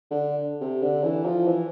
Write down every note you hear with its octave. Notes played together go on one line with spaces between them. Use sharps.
D3
C3
D3
E3
F3
E3